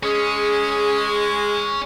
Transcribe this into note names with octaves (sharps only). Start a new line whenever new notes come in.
G#3 C#4 G#4